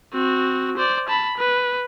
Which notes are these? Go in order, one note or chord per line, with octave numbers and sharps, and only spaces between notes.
C4 F#4
C5 D5
A5 B5
B4